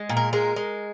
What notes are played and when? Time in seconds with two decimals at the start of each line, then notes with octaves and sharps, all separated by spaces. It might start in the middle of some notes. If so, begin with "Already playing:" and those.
Already playing: G#3
0.09 A#2
0.17 A#4
0.33 G#3 A#4
0.56 G#3